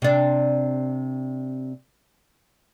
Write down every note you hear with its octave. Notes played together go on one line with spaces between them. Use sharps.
C3 D4